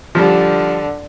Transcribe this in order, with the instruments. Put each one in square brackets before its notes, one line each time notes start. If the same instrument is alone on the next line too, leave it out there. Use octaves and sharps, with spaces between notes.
[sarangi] D3 [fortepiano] F3 G3